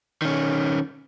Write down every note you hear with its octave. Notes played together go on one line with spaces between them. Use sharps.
D#3 C#4